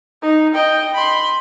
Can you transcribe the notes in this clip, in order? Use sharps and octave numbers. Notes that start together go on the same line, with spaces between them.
D#4
D#5 G5
B5 C6